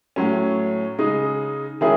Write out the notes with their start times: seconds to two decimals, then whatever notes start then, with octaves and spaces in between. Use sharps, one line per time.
0.16 A2 F#3 C#4
0.98 C#3 G#3 D#4
1.81 D#3 G#3 C#4 E4 G#4